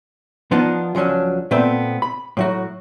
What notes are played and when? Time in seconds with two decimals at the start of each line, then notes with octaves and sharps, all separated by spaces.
0.51 F3 B3 D4 D#4 F4
0.95 C#2 F3 F#3 C#4 D4
1.51 A#2 A3 B3 C4
2.02 B5
2.37 A2 F#3 F#4